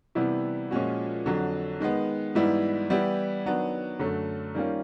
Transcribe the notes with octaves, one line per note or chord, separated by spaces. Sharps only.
C3 E3 G3 B3 E4
A#2 F3 G#3 C#4 F#4
F2 D3 F#3
D#3 G#3 B3
G#2 E3 G3 B3 E4
E3 G3 B3 E4 G4
D#3 F#3 B3 D4
F#2 D3 F#3 A3
D#3 G3 A#3 C#4 F4